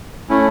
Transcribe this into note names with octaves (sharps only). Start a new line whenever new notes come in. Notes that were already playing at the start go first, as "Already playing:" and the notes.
A3 C#4 E4